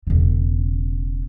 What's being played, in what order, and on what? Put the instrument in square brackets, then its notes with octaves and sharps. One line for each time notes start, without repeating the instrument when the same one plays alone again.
[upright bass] E1 C#3